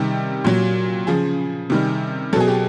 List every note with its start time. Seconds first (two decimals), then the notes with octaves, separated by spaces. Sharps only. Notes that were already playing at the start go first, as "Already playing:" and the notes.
Already playing: C3 D#3 G3 G4
0.45 A#2 F#3
1.07 C#3 F3 G#4
1.70 C3 D#3 G3
2.33 F#3 A4
2.36 B2 G#4
2.48 G4